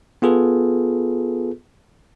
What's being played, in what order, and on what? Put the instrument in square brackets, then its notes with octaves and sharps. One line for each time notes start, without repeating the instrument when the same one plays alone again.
[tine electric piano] B3 F4 G#4 A4 B4